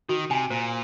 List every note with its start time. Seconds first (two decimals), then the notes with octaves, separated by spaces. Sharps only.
0.09 D#3 F#4
0.30 C3 G#5
0.50 A#2 C5